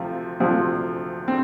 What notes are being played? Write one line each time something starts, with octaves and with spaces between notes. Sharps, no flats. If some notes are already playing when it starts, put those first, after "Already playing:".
Already playing: D2 C3 F3
D2 C3 F3
C4